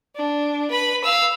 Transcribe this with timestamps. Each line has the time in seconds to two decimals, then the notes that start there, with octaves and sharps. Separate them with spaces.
0.16 D4
0.71 B4 B5
1.04 F5 E6